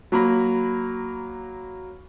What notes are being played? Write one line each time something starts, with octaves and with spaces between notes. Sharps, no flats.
F#3 A#3 B5